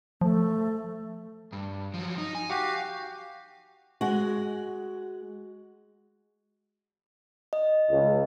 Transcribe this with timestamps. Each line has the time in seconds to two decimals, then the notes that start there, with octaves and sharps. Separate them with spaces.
0.21 F3 A3
1.53 G2
1.94 F3 F#3
2.18 D#4
2.35 G#5
2.50 F#4 G4 F5
4.01 G#3 F#4
7.53 D#5
7.91 C#2